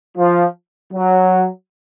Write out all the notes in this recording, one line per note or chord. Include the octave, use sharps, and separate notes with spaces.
F3
F#3